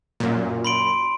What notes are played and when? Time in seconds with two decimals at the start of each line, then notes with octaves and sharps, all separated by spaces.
0.20 F#2 A#2
0.65 B5 C6 D7